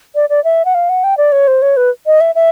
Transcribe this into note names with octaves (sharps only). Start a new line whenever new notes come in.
D5
D5
E5
F#5
F5
F#5
G5
D5
C#5
C5
C#5
B4
D#5
E5
E5